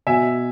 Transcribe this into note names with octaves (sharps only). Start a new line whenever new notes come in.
B2 E5 G#5